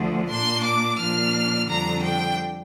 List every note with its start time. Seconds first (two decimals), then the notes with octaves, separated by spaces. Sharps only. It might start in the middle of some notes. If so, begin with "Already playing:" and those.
Already playing: D2 D3 F3 D4
0.29 A#2 A#3 D4 C6
0.64 D6
0.98 A#2 F3 A#3 D4 F6
1.68 F2 D3 G3 D4 A#5
2.02 G5